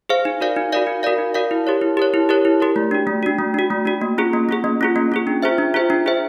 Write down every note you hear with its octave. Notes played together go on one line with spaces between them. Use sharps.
G#4 C5 F5
D#4
F#4 A#4 D5 F5
D#4
F#4 A#4 D5 F5
D#4
F#4 A#4 D5 F5
D#4
F#4 A#4 D5 F5
E4
G4 A#4 C#5
E4
G4 A#4 C#5
E4
G4 A#4 C#5
E4
G4 A#4 C#5
A3
D4 F#4
A3
D4 F#4
A3
D4 F#4
A3
D4 F#4
A#3
C#4 F4 G#4
A#3
C#4 F4 G#4
A#3
C#4 F4 G#4
A#3
C#4 F4 G#4
D4
F4 G#4 C5 E5
D4
F4 G#4 C5 E5
D4
F4 G#4 C5 E5